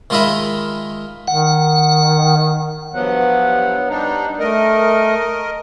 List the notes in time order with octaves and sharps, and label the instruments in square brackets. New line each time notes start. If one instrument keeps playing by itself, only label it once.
[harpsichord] D#3 G#3 F4 D#5 E5 B5
[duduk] D#3 [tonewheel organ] F#5
[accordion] G2 F3 F#3 [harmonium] B3 F#5
[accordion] G3 D4 D#4
[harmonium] A3 [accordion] A#4 D#5